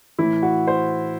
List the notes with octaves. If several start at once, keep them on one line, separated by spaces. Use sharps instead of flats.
A2 E3 E4
F#4
C5